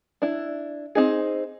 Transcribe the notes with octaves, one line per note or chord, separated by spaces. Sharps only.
D4 E4
C4 D#4 G#4